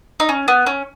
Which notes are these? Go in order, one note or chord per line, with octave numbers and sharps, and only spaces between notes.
D#4
C#4
B3
C#4